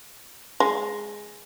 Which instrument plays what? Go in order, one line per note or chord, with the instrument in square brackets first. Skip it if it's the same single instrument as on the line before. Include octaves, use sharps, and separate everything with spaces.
[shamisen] G#3